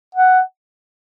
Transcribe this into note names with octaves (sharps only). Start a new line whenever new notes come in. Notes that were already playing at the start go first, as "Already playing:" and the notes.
F#5